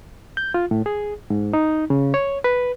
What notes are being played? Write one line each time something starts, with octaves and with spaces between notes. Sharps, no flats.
G6
F4
A2
G#4
G#2
D#4
C#3
C#5
B4